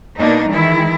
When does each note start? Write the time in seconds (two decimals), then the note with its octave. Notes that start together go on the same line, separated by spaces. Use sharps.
0.18 B2 A#3 D4 D#4
0.47 D#3 E3 G#3 E4